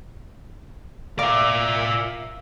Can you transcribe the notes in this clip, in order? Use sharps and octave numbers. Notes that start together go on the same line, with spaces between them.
F4 A#4 D5 E5 F5 D6